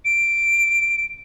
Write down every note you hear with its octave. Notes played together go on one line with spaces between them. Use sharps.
D7